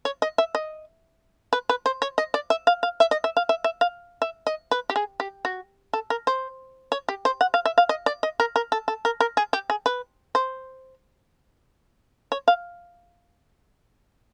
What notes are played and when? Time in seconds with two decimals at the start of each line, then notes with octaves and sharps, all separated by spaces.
0.05 C#5
0.22 D#5
0.38 E5
0.55 D#5
1.53 B4
1.69 B4
1.86 C5
2.02 C#5
2.18 D#5
2.34 D5
2.50 E5
2.67 F5
2.83 F5
3.00 E5
3.11 D#5
3.24 E5
3.37 F5
3.49 E5
3.64 E5
3.81 F5
4.22 E5
4.47 D#5
4.71 B4
4.90 G4
4.96 G#4
5.20 G4
5.45 F#4
5.93 A4
6.10 A#4
6.27 C5
6.92 C#5
7.09 G4
7.25 C5
7.41 F#5
7.54 F5
7.65 E5
7.78 F5
7.89 D#5
8.06 D5
8.23 D#5
8.40 A#4
8.56 A#4
8.72 A4
8.88 A4
9.05 A#4
9.20 A#4
9.37 G#4
9.53 G4
9.70 G#4
9.86 B4
10.35 C5
12.32 C#5
12.48 F5